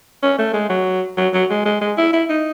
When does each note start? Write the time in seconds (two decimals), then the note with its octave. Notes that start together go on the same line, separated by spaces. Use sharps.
0.23 C#4
0.39 A3
0.54 G#3
0.70 F#3
1.17 F#3
1.34 F#3
1.50 G#3
1.65 G#3
1.81 G#3
1.98 E4
2.13 E4
2.30 D#4